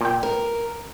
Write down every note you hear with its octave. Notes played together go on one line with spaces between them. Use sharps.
A#2 G5
A#4